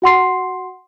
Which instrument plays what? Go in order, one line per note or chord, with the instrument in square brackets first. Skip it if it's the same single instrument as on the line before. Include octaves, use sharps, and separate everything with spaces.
[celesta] F#4 F#5 C6 C7